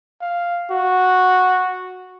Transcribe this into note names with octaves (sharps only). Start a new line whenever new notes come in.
F5
F#4